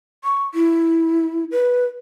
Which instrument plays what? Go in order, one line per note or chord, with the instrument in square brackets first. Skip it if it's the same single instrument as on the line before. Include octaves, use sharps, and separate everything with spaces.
[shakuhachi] C#6
E4
B4